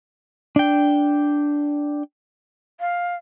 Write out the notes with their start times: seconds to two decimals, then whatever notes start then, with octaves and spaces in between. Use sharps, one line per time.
0.56 D4 G5
2.80 F5